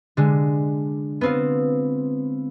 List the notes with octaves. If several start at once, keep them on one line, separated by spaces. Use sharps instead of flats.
D3 G#3
B3 C4 F4